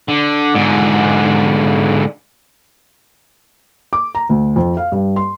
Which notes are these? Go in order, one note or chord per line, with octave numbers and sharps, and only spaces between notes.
D3
G#2 D3
D6
A#5
D2
F2
F5
G2
C6